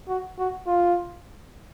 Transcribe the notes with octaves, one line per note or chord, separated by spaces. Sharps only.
F#4
F#4
F4